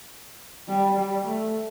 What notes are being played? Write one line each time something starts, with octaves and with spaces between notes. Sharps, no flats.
G3
G3
A3